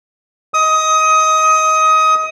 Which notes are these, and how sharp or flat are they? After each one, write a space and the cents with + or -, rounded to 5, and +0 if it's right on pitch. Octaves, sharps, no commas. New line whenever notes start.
D#5 +25 D#6 +20